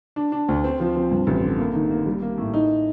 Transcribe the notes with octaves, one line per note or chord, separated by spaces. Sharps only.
D4
D4
D2
C4
F3
C4
G2
A1
D3
A#3
D#3
A#3
G3
A#3
A2
D#4